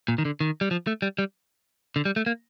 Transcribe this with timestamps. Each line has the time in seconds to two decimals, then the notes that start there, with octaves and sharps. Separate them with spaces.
0.08 A#2
0.18 D#3
0.25 D3
0.41 D#3
0.61 G3
0.71 F3
0.87 A3
1.02 G3
1.18 G3
1.96 D3
2.05 G3
2.16 A3
2.26 A#3